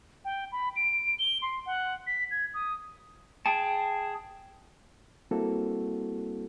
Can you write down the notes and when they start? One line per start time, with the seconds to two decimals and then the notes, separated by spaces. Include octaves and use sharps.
0.25 G5
0.52 B5
0.76 D7
1.19 G7
1.42 C6
1.66 F#5
2.07 B6
2.31 G#6
2.54 D#6
3.46 G#4 G5 A5
5.31 G3 A#3 C4 E4 F#4 A4